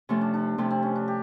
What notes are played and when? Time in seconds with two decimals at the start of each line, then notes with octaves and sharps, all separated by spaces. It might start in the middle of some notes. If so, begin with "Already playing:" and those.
0.09 C3 F3 A3 C#4
0.21 D4
0.34 D4
0.58 C3 F3 A3 C4
0.71 C4
0.83 C#4
0.96 D4
1.08 G4